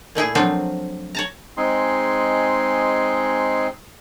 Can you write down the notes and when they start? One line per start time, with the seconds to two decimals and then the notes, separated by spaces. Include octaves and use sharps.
0.15 A#2 A3 E4 G#4
0.35 F3 F#3 A3 C4 D4 F4
1.15 C#5 A5 A#5
1.57 G#3 C4 D#4 G#4 C6